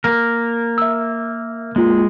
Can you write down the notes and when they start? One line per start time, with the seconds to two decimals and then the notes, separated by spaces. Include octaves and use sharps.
0.04 A#3 A#4
0.78 E5 E6
1.76 G#3 A#3 F4